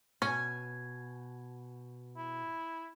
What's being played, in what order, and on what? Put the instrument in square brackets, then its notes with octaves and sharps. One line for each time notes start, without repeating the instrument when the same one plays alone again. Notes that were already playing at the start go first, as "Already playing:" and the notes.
[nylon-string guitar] B2 [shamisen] C#4 [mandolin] G#5
[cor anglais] E4